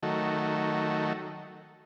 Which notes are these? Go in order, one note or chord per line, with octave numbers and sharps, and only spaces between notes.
D#3 F#3 A3